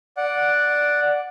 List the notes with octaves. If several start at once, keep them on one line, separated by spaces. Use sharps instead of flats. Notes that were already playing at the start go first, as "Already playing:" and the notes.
D5 F#5